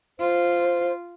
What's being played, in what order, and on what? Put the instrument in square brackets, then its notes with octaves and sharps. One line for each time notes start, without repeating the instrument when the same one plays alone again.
[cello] F4 [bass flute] C5